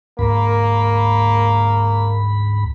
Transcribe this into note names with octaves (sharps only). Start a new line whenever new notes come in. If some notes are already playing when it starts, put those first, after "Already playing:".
D2 G#2 A#3 B5